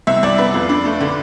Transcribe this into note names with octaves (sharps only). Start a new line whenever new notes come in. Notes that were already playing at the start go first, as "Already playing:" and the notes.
C2 E5
C2 D5
B3 B4
F2
D4
A3
D3